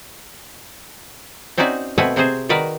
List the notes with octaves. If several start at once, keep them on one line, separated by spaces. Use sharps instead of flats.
C4 C#4 D#4 F#4 D5 E5
B2 A3 C4 E5 F#5 G#5
C3 C4 F#4 G#4 C5
D#3 F#4 A#4 B4 D5 A#5